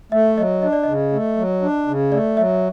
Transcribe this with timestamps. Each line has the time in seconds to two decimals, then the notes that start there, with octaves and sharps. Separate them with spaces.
0.12 A3 E5
0.37 F#3 D#5
0.62 D4 D#5
0.73 D5
0.83 C#3 D#5
1.13 A3
1.37 F#3
1.62 D4
1.88 C#3
2.12 A3 D5
2.37 F#3 E5